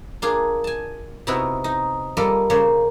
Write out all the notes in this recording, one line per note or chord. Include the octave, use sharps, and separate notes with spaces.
A#3 D4 F4 G#4
G#5 A5
C3 B3 D#4 E4 F#4
D#4
G3 A#3 F4 A4 D#5
C#3 A#3 C5 C#5